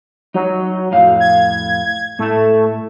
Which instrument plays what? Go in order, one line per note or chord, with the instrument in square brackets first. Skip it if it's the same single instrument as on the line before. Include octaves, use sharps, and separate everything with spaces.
[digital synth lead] F#3 [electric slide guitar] D#4
[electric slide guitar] F2 A2 F5
[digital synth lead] G#6
[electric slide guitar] A2 A5 [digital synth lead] A3